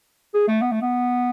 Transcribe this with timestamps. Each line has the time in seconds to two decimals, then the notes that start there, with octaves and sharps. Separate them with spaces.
0.34 G#4
0.48 A3
0.61 B3
0.71 A3
0.82 B3